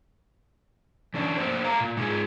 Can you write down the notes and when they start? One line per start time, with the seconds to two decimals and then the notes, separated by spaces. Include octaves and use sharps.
1.14 E3 C#4 D4
1.37 A3 A#3 A#4 C5
1.64 A4 F5 A#5
1.80 A#2
1.97 G#3 D#4 F4 G#4